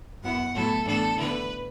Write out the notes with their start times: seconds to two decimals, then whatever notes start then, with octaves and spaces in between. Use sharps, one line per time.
0.22 F#2 F#3 B3 E4 F#5
0.53 A2 F#3 B3 E4 A4
0.85 A2 E3 B3 D4 A4
1.17 D3 B3 E4 B4